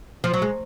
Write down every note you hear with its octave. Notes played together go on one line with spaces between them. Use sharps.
F3
F#3
G#3